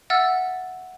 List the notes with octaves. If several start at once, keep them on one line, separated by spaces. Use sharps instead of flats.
E5 F#5 E6 F6 A6